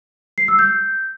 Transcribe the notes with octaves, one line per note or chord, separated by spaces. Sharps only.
C7
E6
G6